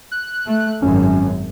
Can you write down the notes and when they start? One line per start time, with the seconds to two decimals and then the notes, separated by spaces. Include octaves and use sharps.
0.12 F#6
0.47 A3
0.82 G#1 F#2 C#4